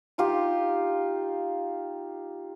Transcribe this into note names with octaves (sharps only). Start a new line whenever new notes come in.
D#4 F4 G4